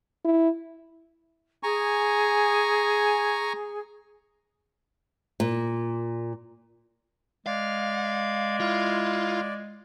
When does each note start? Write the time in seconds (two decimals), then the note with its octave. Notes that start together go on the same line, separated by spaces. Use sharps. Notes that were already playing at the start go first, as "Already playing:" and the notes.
0.25 E4
1.63 G#4 G#5 A#5 C#6
5.40 A#2
7.46 G#3 D5 F5
8.60 E4 F4 F5